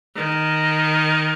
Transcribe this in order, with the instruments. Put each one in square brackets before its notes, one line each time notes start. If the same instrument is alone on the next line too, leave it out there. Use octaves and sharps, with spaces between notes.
[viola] D#3